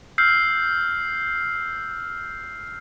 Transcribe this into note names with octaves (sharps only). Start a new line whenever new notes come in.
E6 F6 G6 C7